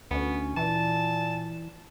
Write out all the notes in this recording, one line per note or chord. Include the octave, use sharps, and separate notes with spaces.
D2 B3 C#4
A#2 E3 A5